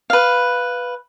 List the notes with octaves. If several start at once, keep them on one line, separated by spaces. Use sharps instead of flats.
B4 F5